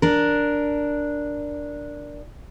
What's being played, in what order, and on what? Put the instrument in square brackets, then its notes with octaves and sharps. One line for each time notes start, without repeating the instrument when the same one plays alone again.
[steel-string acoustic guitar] D4 A#4